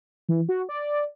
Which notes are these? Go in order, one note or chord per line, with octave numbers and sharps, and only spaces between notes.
E3
F#4
D5